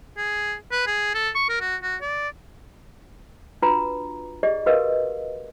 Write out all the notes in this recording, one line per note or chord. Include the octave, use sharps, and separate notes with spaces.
G#4
B4
G#4
A4
C#6
A#4
F#4
F#4
D5
D4 F4 F#4 B4 A#5
G4 G#4 D5 D#5
F#4 G4 A#4 B4 D#5 F5